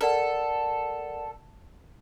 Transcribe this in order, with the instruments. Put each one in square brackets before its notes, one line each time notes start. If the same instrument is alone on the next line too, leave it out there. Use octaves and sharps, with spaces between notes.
[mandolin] A4 [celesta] A#4 D5 F#5